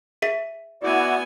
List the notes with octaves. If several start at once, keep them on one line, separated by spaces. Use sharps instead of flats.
G#4 E5 B6
B3 E4 F#4 D5 G#5